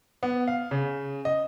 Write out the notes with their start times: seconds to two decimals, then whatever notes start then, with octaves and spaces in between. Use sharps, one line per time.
0.23 B3
0.48 F5
0.71 C#3
1.25 D#5